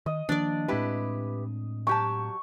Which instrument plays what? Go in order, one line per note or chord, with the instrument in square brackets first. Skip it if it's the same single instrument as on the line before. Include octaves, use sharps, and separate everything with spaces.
[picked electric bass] D#3 [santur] D#5
[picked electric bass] D#3 F3 A#3 [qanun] D4 D5
[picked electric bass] A2 G#3 C4 [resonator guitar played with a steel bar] E4 G4 B4
[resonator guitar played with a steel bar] F#3 G4 A5 [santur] C#6